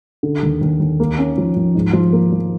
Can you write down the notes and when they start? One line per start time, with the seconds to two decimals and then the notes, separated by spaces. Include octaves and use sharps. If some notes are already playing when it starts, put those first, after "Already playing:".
0.23 D3
0.43 D#2
0.61 D#2
0.80 D#2
1.00 A#3
1.18 C#4
1.38 F3
1.56 F3
1.75 G#2
1.93 F3
2.13 A#3
2.32 F3